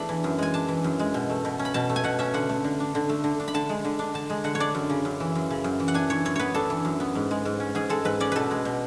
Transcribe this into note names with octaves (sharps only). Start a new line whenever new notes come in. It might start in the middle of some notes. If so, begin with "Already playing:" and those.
Already playing: E2 A3 D4 B5
E3
F#2
G#3 G#5
D4 A5
E3
F#2
G#3
B2
A3
B2
C#4
B5
B2 A5
A3
G#5
B2 F#5
C#4 E5
D3 F#5
A3
D3
D4
D3
A3
D3
D4
B5
D3 A5
G#3
D3
D4
D3 A5
G#3
D3 F#5
C#5
D4 D5
F#2
C#3
F#2
E3
F#2
C#3
F#2
E3
F#5
D4 G#5
E3 C#5
F#2 C#5
B3 B4 C#5
D4 A4
E3
F#2
B3
G#2
G#3
G#2
C#4
G#2 G#4
G#3 A4
G#2 B4
C#4 D5
B2 A4 B4
G#3
B2